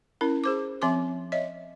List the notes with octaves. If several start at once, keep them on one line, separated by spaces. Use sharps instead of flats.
C#4 E4 A#4
G#4 C5 D6
F3 C4 E5 C6 D6
C#5 D#5 E5